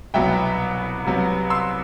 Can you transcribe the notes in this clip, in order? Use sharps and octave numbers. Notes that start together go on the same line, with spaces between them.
C2 B2 F#3 B3 E5 G5
C2 C3 F#3 B3
C6 E6